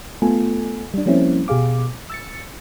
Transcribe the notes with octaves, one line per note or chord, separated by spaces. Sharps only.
A3 B3 F4 A4 G#5
G3 D4
F3 G3 A#3 C4 C#4 E4
B2 G4 G#4 F5 D6
E6 A6 C#7